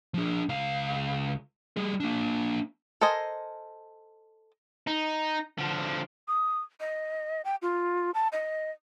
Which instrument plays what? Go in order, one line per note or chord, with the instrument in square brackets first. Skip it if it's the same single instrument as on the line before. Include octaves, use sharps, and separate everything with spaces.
[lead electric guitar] F3 D4
C#2 F5
G3 G#4
A#3 D4
[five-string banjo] A4 A#4 C5 D#5 G#5
[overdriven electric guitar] D#4
D3 F3
[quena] D#6
D#5
G5
F4
A5
D#5